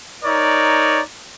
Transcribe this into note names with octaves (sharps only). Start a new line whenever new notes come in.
D#4 A#4 C#5 D5